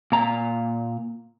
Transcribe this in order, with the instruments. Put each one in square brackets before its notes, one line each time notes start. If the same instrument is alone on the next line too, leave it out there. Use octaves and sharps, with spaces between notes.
[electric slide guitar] A#2 A#5